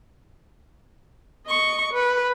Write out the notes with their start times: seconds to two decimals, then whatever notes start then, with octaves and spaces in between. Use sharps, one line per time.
1.47 D#5 C#6
1.93 B4